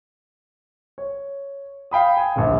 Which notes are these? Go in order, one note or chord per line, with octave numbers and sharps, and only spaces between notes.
C#5
F5 G5 B5 D#6
G#5
D1 A#1